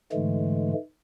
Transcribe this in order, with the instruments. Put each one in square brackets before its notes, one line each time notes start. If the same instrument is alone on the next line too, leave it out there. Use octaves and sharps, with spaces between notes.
[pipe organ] G#2 D3 E3 G#3 A3